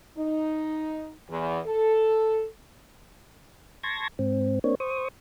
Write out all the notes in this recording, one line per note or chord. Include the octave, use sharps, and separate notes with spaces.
D#4
E2
A4
A5 C6 C#6 G#6 A#6
G#2 C4
A#3 C4 D4 C#5
C5 C#6 D#6